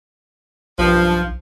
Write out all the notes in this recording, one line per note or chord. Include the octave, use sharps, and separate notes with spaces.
B1 G2 F3